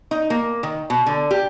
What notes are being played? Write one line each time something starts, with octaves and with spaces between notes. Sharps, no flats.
D#4
A#3
D#3
B2
D3
G4